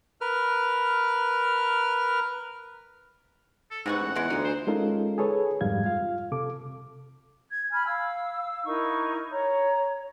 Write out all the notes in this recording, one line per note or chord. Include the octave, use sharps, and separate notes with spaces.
A#4 B4 F6
A4
G#2 C3 B3 F#5 C#6
A1
E2 E3 G#3
D2 D#4 F4
C5
G#3 C#4 D#4 F4 A4 A#4
G#4 A4 B4 C#5
F2 G#2 G3 F5 G#6
F4 F5
C3 A4 D6
G#6
G#5 B5 F6 G#6
F5 E6
D#4 E4 A#4 C#6
C#5 A#5